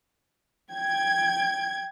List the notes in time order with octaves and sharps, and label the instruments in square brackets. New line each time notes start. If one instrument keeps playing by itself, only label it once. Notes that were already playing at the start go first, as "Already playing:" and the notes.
[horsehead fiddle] G5 [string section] G#6